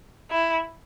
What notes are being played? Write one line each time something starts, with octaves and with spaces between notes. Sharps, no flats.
E4